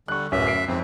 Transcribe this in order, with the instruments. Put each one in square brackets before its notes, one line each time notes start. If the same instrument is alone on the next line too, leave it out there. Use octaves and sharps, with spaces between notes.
[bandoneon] D3 G3 [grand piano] C#6 F#6
[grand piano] D1 C#4 [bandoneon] F#2 E5
[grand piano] C7 D7
[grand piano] F2 [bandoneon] G#2 C4